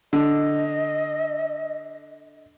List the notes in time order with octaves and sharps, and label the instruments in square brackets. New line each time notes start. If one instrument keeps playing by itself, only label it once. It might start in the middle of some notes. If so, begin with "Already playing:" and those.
[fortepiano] D3 [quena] D#5